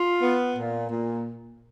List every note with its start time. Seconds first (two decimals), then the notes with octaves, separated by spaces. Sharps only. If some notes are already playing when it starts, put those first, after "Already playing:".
Already playing: F4
0.22 B3
0.55 A#2
0.90 A#2